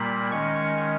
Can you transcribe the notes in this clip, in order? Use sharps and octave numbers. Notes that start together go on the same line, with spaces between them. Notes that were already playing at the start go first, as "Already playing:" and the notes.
Already playing: A#2 G3 A#3 B5
D#3 G#3 C#4 C#6